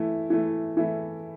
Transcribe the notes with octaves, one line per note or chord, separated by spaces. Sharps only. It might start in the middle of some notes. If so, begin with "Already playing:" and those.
Already playing: E3 A3 E4
E3 A3 E4
E3 A3 E4